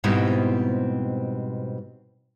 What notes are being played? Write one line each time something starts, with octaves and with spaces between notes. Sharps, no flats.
G#2 B2 G3 C4 E4 D#5